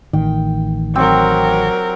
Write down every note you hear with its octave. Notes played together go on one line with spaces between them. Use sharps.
A1 D#3 G5
F#3 C4 G4 A#4